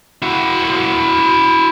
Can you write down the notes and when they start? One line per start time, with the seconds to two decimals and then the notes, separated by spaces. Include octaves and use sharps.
0.22 E4 F#4